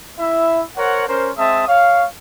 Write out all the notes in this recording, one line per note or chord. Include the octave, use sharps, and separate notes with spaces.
E4 E5
A#4 C5 C#5 F#5
C#4 A#4 C5
G#3 C4 E5 A5 D#6
C#5 F5